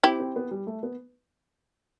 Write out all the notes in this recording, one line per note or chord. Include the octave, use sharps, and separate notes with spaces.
C4 E4 G4
C4
B3
G3
A3
B3